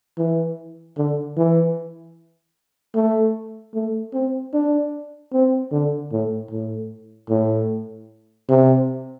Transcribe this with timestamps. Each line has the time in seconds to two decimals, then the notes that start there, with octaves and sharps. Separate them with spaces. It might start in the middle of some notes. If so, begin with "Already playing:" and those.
0.18 E3
0.97 D3
1.37 E3
2.95 A3
3.74 A3
4.14 C4
4.53 D4
5.33 C4
5.72 D3
6.12 A2
6.51 A2
7.30 A2
8.49 C3